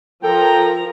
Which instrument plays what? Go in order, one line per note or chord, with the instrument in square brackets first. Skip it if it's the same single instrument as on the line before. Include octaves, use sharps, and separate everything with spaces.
[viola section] F3 A#4 A#5 [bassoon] A4 [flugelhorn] G5